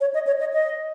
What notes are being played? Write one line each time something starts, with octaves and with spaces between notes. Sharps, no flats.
C#5
D#5
C#5
D#5
D#5